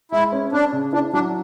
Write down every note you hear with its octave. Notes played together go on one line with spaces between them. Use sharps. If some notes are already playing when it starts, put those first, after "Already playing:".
G#3 E4
C#4
C#4 D4
C#3
D4 E4
F#3 D4